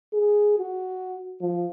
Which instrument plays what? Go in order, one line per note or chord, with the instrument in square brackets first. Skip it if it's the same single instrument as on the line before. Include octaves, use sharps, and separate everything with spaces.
[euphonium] G#4
F#4
F3